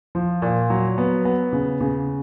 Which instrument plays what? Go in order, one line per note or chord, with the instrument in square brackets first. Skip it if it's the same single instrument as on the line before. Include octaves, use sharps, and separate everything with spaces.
[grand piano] F3
A#2
F#3
B3
B3
C#3
C#3